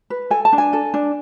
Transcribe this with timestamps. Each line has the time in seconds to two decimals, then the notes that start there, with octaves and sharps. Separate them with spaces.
0.10 B4
0.30 A4 G#5
0.45 A5
0.53 D4
0.58 G#5
0.73 A4
0.94 D4